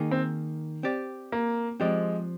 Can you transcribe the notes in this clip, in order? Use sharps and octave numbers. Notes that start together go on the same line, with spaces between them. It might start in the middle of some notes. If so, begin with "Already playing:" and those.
Already playing: D#3 A#3 D#4 G#4
C4
C4 G4 D5
A#3
F3 G#3 C4 G4 D5